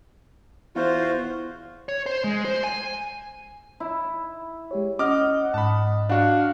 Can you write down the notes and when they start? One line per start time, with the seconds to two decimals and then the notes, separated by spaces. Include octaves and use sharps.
0.76 E2 F4 F#4 C5
1.89 C#5
2.06 C5
2.24 G#3
2.45 C5
2.64 G#5
3.80 E4
4.71 G#3 G4 C#5
4.99 C#4 D#5 F#5 D6 F6
5.54 G#2 A5 B5
6.09 D4 F#4 F5 F#5